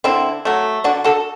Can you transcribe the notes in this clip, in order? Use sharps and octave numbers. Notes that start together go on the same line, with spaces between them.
D3 C4 E4
F#3 A3
D3 D4 F#4
F#4 A4